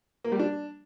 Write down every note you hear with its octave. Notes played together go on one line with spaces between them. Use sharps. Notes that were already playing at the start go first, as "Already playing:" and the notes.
A#3
G3
D4